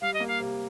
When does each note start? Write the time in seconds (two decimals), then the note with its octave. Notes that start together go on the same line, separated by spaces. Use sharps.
0.01 G3 F5
0.14 D#5
0.20 A#3
0.27 F5
0.40 C3